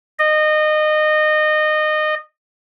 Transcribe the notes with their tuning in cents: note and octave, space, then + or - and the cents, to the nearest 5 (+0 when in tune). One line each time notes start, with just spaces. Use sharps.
D#5 -25